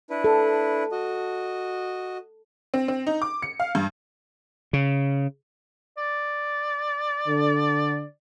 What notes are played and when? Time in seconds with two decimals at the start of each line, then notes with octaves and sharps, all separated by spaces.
0.10 D4 E4 B4
0.24 A4
0.92 F#4 D#5
2.74 C4
2.88 C4
3.07 D#4
3.22 D6
3.42 C#7
3.60 F5
3.75 G2
4.73 C#3
5.98 D5
7.28 D3